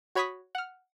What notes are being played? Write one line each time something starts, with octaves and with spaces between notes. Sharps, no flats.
F#4 C#5 B5 C#6 D#6 B6
F#5 F6